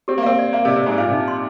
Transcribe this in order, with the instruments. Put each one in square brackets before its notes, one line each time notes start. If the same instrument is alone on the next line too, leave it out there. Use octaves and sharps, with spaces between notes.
[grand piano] C4 [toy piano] G4
[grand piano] A#3
[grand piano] C4 [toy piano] F5
[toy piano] D5
[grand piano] A#3 [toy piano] F5
[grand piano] C3
[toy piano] D5
[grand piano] C3
[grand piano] G#2 [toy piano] D5
[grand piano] A#2 [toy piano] F5
[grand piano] C3
[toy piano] D#4
C6